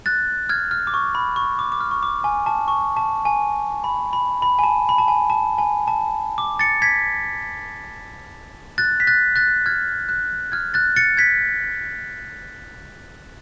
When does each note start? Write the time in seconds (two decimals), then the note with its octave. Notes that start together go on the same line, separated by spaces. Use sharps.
0.06 F#6 A6
0.49 F6 G#6
0.71 F6
0.87 D6
0.94 C#6
1.15 B5
1.36 C#6
1.59 D6
1.72 D6
1.80 F6
1.91 C#6
2.03 D6
2.24 G#5
2.46 A5
2.68 C#6
2.97 A5
3.25 G#5
3.84 B5
4.13 B5
4.42 B5
4.59 G#5
4.64 A5
4.89 B5
4.98 A5
5.08 G#5
5.30 A5
5.58 G#5
5.88 A5
6.38 D6
6.59 A6 C#7
6.82 G#6 B6
8.78 F#6 A6
9.00 B6
9.07 F#6 A6
9.36 F#6 A6
9.66 F6 G#6
10.09 F#6
10.52 F6 G#6
10.74 F#6 A6
10.96 A6 C#7
11.17 G#6 B6